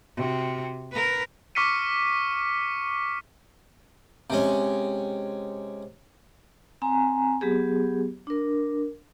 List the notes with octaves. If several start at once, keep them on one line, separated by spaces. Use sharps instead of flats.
C3 F#4
A#4 B4
C#6 D6 F6 B6 C#7 D#7
C3 G#3 C#4
C4 G#5 A#5
F#3 B3 G4 G#4
D4 A#4